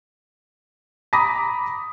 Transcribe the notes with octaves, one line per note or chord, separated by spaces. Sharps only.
A#5 B5 D6 D#6 A#6 B6